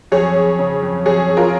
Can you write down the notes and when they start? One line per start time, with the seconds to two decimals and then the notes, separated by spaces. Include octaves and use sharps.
0.12 F2 G#4 C#5
0.35 F2
0.59 C#3
0.82 F2
1.06 F2 G#4 C#5
1.29 F2
1.37 F4 A#4